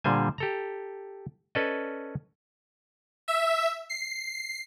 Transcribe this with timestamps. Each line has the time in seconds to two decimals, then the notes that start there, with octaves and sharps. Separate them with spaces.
0.04 A#2 D3 G3 C5 G#5
0.38 G4 A4 A#5
1.55 C#4 A4 B4 D5 D#5
3.28 E5
3.90 C7